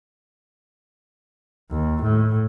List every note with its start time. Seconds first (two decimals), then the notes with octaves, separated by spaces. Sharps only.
1.71 D#2
2.02 A2